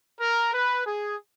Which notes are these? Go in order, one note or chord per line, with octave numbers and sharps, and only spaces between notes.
A#4
B4
G#4